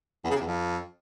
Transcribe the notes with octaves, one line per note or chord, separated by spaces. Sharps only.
E2
C#3
C3
E2
F2